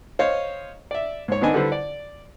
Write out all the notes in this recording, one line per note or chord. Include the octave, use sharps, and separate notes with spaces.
C5 C#5 D#5 F5
D5 E5
G#2 C#5
D#3 B3 C4 D4 D#5 G#5
D3 G3 E4 A4 B4 C5
D5